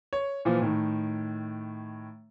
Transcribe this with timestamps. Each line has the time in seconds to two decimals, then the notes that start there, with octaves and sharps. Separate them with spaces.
0.13 C#5
0.45 A#2 E3 F3
0.61 A2 D#3